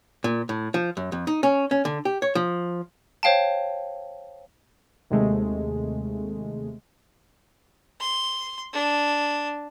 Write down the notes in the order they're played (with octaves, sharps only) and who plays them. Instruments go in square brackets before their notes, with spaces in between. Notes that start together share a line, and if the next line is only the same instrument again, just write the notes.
[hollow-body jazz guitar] A#2
A2
F3
F#2
F2
D#4
C#4
C#4
D3
G4
C#5
F3
[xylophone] C5 C#5 F5 G5 A5
[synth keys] D#2 C3 G#3 A3
[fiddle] C6
D4